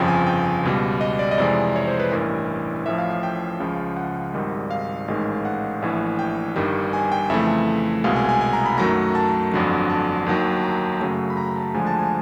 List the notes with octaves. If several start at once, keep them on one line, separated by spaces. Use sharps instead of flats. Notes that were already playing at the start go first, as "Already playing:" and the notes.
Already playing: G1 F2 C#3 F3 G5
G#5
G5
C#2 B2 G3
D#5
D5
D#5
F2 C3 E3 G#3 D5
C#5
C5
B4
A1 G2 E3 A#4
A1 A2 F3 E5
F5
F5
G5
C#2 C#3 F3
F#5
G#1 G#2 D#3 G3
F5
A1 G#2 D#3 G#3
F#5
A#1 A2 E3
G5
G1 G2 D#3 G3
G#5
G5
F2 C#3 E3 A3 E5
C2 B2 G#3 F5
G#5
G#5
G#5
A#5
B5
F#2 D#3 F#3 A3 A#5
A5
G1 F2 D3 F#3
A5
D#2 D#3 F#3
A#5
F#2 C#3 F#3 A3
B5
A#5
A5
D2 D3 F3 G#3 G#5
A5
G#5